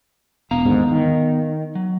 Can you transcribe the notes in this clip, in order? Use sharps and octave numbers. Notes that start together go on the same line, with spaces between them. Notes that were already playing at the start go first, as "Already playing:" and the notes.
E1 B3 F5 A#5
D#2 G#2 D3
D#3
F#3